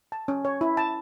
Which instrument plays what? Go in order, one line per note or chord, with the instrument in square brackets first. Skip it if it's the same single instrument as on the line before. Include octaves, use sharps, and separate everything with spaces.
[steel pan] A5
C#4
C#5
E4
A5